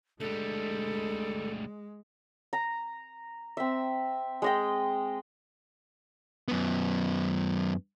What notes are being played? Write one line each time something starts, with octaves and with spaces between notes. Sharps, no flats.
D2 G3 G#3 A4
A#5
C4 E5
G#3 D#5 G5
F#2 B3